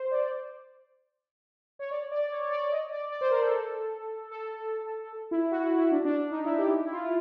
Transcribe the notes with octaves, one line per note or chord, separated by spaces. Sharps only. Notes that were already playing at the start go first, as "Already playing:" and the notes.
Already playing: C5
D5
C#5
D5
D5
C#5
C#5
D5
D#5
D5
D5
C5
A#4
A4
A4
E4
F#4
E4
E4
D4
D4
D4
D#4
E4
G4
E4
F4
F4